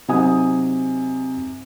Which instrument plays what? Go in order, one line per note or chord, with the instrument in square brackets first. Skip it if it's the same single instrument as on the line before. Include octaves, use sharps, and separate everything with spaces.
[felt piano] C3 F#3 D#4 G#5 D#6